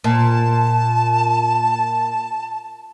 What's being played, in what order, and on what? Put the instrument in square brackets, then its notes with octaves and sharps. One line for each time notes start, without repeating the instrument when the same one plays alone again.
[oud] A#2 [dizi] A5